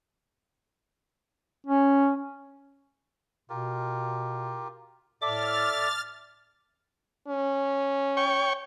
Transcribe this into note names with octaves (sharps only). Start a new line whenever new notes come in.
C#4
B2 F4 G4 A#4
A2 A4 D5 E5 D6 F6 A6
C#4
C#5 G5 C#6